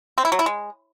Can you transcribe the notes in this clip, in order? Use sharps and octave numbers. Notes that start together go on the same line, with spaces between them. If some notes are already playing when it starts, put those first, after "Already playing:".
C4
E4
F#3
E4
G#3